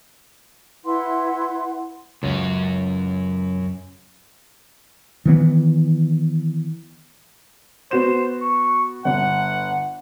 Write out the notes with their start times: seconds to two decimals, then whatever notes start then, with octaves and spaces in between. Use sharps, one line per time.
0.85 E4 B4 F#5 C6
2.23 C#2 F#2 C#4
5.25 D#3 E3 B3
7.91 B3 F#4 C5 E7
8.42 C#6
9.05 G1 F#5